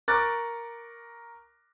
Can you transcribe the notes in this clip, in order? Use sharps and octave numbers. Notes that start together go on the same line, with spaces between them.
A#4 C#6 D6 F#6 A6